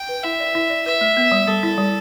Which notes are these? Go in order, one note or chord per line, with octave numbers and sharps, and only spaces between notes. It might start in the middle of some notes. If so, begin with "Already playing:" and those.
Already playing: G5
B4
E4 E5
D5
E4
D5
B4 E5
A3
B3
G3
G3 A4
E4
G3